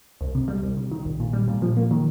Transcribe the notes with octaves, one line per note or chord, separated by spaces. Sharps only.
C2
C3
G3
C2
C3
D#3
A#1
A#2
G3
A#2
F3
A#3
D#3